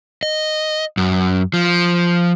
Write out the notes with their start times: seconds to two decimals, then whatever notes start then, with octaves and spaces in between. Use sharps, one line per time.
0.23 D#5
0.97 F#2
1.54 F3